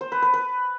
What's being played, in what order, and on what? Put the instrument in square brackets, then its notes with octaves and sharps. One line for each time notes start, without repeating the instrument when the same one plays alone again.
[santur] C5
B4
B4
B4